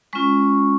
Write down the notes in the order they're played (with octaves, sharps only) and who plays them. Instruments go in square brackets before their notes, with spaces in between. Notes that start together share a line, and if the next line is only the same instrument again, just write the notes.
[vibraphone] G#3 C#4 F4 C#6